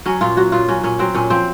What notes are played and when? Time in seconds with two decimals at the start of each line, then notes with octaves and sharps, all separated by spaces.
0.06 F#3 C#4
0.21 A#2 F4
0.37 F#3 F#4
0.52 A#2 F4
0.68 F#3 C#4
0.83 A#2 C#4
0.99 F#3 C4
1.14 A#2 C#4
1.30 F3 C4